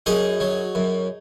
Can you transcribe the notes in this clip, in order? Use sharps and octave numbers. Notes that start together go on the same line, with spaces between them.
F#2 D#4 G#4
F#3
F#2